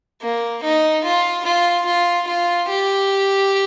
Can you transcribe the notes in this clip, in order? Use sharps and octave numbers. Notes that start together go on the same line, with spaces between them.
A#3
D#4
F4
F4
F4
F4
G4